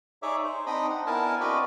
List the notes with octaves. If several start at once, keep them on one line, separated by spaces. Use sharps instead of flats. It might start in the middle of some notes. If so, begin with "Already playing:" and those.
D#4 G#4 C#5 D5 E5 D6
C5
C4 D4 D#4 D#5 B5 D#6
F#5
B3 D4 E4 A#4 G#5 A5
C4 F#4 B4 D5 D#5 B5